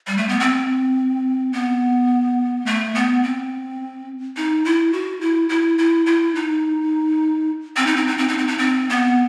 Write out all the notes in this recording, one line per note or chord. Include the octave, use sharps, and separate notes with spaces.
G3
A3
B3
C4
B3
A3
B3
C4
D#4
E4
F#4
E4
E4
E4
E4
D#4
C4
D#4
C4
D#4
C4
D#4
C4
D#4
C4
B3